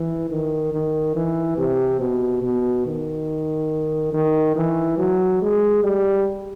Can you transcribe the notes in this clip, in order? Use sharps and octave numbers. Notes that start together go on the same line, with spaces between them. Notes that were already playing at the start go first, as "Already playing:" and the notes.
Already playing: E3
D#3
D#3
E3
C3
B2
B2
D#3
D#3
E3
F#3
G#3
G3